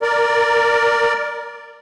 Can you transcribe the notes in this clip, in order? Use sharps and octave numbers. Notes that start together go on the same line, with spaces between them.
A#4 D5